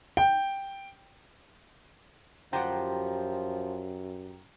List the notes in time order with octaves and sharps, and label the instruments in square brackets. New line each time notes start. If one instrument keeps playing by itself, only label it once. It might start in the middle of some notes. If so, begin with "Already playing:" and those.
[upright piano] G5
[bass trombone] F#2 [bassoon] F3 [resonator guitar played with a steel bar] F4 G4 F#5 [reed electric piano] G5 A#5